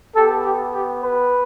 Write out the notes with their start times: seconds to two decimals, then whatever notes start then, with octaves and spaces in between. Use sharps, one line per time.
0.15 B3 G4 A4
0.44 G4
0.74 G4
1.03 B4